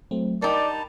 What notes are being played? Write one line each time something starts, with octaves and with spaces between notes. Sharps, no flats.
F#3 A3 C4
G3 D#4 A#4 D5 G5 A5 B5